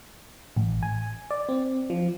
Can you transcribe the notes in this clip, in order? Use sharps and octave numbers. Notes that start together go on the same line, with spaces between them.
A1
G#5
D5
C4
F3